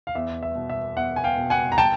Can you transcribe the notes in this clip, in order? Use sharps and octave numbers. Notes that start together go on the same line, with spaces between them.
F5
E2 E5
E5
B2
E5
E2 E5 F#5
G#5
F5 G5
B2
F#5 G#5
A#5
G5 A5